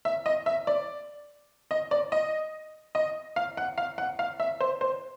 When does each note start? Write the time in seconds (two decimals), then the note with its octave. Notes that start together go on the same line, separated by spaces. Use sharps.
0.05 E5
0.26 D#5
0.46 E5
0.67 D5
1.71 D#5
1.91 D5
2.12 D#5
2.95 D#5
3.36 F5
3.57 F#5
3.78 F5
3.98 F#5
4.19 F5
4.40 E5
4.60 C5
4.81 C5